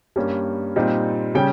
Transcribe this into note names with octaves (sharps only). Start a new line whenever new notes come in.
G2 G3 A#3 C#4
A#2 G3 C4 D#4
C#3 G3 C#4 G5